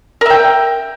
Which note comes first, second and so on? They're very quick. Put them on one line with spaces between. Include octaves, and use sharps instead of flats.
A#4 E5 G5